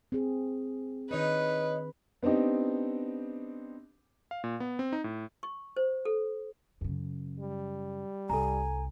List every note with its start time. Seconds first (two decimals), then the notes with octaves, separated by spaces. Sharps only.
0.12 C4 G#4
1.11 D#3 D4 D#4 B4 C#5
2.23 B3 C4 D4 D#4 G4
4.31 F5
4.44 A#2
4.60 B3
4.79 C4
4.92 D#4
5.04 A2
5.43 C#6
5.76 C5
6.05 A4
6.81 F#2 C#3
7.39 G3
8.30 C2 A4 G#5 A#5